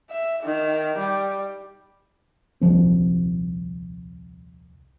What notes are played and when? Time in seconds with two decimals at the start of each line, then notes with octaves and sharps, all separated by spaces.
0.10 E5
0.43 D#3
0.98 G3
2.61 D#1 C2 F3 C4